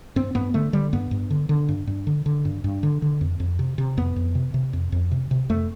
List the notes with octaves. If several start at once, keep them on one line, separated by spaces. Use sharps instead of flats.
G2 C4
G2 B3
D3 A3
D3 G3
G2 B3
G2
D3
D3
G2
G2
D3
D3
G2
G2
D3
D3
F2
F2
C3
C3
F2 B3
F2
C3
C3
F2
F2
C3
C3
F2 A3